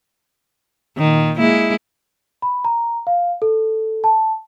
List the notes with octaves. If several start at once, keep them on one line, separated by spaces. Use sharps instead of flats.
A#2 D#3
G#3 A#3 E4
B5
A#5
F5
A4
A5